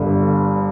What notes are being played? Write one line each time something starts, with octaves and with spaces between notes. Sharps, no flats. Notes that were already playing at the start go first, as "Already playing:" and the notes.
Already playing: G1 G2 D3